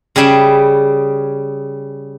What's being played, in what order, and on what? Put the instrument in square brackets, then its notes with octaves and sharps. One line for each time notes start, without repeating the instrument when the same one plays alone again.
[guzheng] C#3 G3 G#4 E5 B5